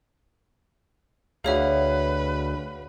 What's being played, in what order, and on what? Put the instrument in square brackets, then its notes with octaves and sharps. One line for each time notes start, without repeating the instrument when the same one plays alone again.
[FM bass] D2 [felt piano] F#4 F5 [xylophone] G#4 C#5 E5 [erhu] B4